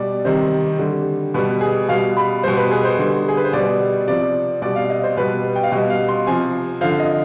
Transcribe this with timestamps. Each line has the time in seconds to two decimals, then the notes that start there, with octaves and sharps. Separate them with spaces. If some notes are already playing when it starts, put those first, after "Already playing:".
Already playing: B2 G3 D5
0.25 C3 D#3 G3 C5
0.79 D3 G3
1.34 B2 G3 B4
1.61 G#4
1.88 B2 G3 F5
2.17 B5
2.44 B2 G3 C5
2.57 B4
2.71 G#4
2.84 C5
2.98 D3 G3
3.29 G#4
3.37 B4
3.44 C5
3.53 B2 G3 D5
4.07 C3 F3 D5
4.62 B2 G3 D5
4.76 F5
4.90 D#5
5.03 C5
5.17 B2 G3 B4
5.56 G5
5.63 F5
5.72 B2 G3 D#5
5.90 F5
6.09 C6
6.27 C3 F3 G#5
6.81 D3 F3 F5
7.00 D#5